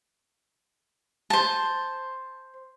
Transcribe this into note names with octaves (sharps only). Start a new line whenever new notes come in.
C5 A5